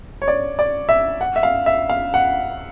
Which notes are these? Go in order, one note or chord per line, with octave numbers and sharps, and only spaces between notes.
C#5
D5
D5
E5
F#5
E5
F5
E5
F5
F#5